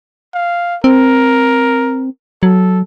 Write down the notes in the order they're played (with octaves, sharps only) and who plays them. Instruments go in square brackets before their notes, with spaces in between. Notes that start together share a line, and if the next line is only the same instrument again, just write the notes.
[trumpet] F5
[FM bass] C4 [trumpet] A#4
[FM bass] F#3 [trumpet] A4